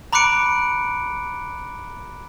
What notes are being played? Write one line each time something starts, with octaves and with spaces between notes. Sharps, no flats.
A#5 B5 D6 F#6 C#7 D7